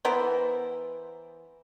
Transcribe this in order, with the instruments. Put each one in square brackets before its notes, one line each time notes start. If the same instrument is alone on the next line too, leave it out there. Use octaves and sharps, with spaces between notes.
[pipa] E3 B3 A#4 C5